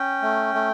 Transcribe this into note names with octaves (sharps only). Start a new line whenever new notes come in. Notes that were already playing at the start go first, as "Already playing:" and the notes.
Already playing: C#4 G5
A3
A3